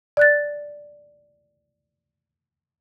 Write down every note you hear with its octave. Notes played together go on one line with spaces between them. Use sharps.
D5 F#6 A6